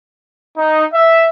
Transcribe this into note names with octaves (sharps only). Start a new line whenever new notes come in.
D#4
E5